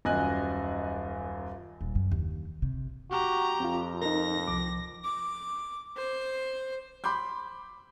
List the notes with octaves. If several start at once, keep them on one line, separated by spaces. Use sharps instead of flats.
D#1 F#2 D#5 G#5 F#6
D#1
F#2
D#2
C3
F#4 G4 A#5
F2 C4 F4
D#4 A#4 A#6
C2 F3 D6
D6
C5
B5 C6 D6 G6